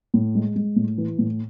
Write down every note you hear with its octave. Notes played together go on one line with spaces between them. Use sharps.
A2
G#3
G#3
A2
E3
A2